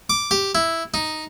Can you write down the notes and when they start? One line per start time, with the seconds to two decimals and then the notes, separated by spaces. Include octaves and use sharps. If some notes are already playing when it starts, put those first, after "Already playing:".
0.10 D6
0.31 G4
0.55 E4
0.94 D#4